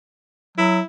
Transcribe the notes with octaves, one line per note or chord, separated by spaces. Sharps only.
F#3 E4